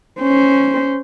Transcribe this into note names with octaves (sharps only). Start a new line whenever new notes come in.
C#4 C5